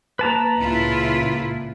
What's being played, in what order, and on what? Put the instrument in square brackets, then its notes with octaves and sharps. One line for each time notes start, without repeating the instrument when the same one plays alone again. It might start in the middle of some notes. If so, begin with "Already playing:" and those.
[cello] A#3 [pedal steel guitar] B4 A5 A#5
[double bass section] C#2 A#2 [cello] E4 F4